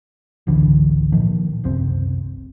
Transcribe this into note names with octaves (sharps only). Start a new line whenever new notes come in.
G#1 C#2 D3 E3
A#2 D#3 F3
F#1 C2 C4